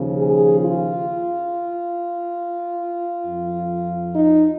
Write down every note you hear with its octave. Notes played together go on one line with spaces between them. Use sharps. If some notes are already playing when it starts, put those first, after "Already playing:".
Already playing: D#2 C#3 F3
G#4
F4
F2 F3
D#4